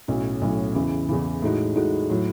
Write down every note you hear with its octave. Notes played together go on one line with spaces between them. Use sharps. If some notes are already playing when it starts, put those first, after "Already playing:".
B1 A2 F#3 C#4
B1 A2 F#3 C#4
E2 C#3 E3
E2 C#3 E3
A2 G#3 D#4 F#4
A2 G#3 D#4 F#4
A2 F#3